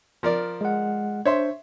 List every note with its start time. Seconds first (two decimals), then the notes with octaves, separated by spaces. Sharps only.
0.23 F3 A#4 D5
0.61 G#3 F#5
1.26 D4 C5 C#5 E5 C6